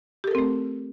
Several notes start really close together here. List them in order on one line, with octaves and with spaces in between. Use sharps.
G4 A4 A#4 C4 A3